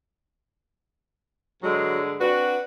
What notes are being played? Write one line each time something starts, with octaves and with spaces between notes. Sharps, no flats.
G2 D3 F#3 G#3
C4 D4 F#4 B4